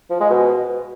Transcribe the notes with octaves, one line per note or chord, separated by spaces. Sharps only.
F3
G#3
B2